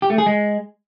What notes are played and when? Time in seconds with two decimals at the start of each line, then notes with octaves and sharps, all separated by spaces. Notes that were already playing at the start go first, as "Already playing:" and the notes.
0.02 G4
0.10 A3
0.18 G#4
0.26 G#3